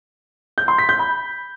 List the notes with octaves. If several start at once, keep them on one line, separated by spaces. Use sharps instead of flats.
G6
C6
B6
G6
B5